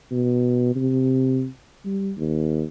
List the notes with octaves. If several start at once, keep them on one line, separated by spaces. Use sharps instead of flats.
B2
C3
G3
D#2